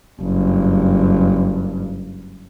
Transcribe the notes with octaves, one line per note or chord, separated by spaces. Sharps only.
F#1 G2